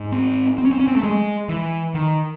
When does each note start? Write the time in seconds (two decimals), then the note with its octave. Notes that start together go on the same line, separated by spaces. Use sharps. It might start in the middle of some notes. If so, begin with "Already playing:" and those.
Already playing: G#2
0.12 C4
0.58 C4
0.65 C#4
0.72 C4
0.80 C#4
0.87 C4
0.96 A3
1.03 G#3
1.49 E3
1.94 D#3